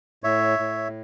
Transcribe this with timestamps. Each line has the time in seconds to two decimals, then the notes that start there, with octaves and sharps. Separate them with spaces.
0.24 A2 C#5 E5
0.59 A2